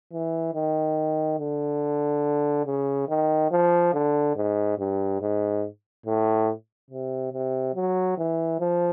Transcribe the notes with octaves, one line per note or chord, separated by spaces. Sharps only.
E3
D#3
D3
C#3
D#3
F3
D3
G#2
G2
G#2
A2
C3
C3
F#3
E3
F3